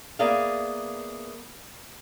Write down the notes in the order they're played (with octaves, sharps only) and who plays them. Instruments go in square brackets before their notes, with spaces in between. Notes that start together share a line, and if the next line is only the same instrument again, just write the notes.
[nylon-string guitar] A#3 B3 G#4 D5 E5 F5